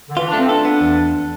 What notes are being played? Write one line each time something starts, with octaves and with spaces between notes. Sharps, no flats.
D3
E3 F4
D4
A3
C4
D4 A4
B3
E2